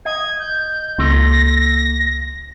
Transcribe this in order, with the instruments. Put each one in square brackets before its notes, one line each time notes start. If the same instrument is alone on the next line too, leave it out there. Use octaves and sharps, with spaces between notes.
[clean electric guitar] D#5 [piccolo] G#6
[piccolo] G6
[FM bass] C#2 [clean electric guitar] A#3 A4 C6 [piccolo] A#6